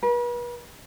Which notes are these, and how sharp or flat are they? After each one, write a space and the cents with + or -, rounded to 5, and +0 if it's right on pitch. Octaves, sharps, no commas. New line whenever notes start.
B4 -40